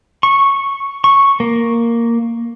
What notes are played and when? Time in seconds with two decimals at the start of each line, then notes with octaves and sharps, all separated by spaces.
0.23 C#6
1.04 C#6
1.40 A#3